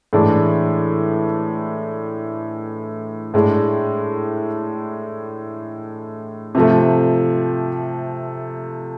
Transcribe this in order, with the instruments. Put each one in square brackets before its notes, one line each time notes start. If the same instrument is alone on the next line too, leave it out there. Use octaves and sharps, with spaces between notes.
[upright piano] A2 E3 G#3 D4
A2 G#3 D4
C3 F3 A3